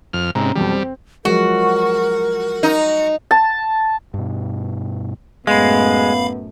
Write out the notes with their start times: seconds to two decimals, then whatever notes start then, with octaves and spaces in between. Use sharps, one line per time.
0.13 F2 F6
0.35 G#2 C3 C#4 A#5
0.56 F2 B2 F#3 G3
0.71 C4
1.25 F3 F#3 G#3 F#4 A#4
2.63 D#4
3.31 A5
4.14 G2 B2
5.47 F#2 A2 G#3 B3 F5 B5